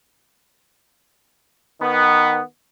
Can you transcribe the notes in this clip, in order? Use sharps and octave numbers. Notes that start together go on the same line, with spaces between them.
D#3 B3